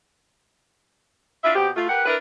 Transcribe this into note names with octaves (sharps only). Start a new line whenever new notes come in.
D4 E4 F4 E5
B2 C4 G4
A3 F4
G4 A#4 B4 F#5
D4 E4 A#4 B4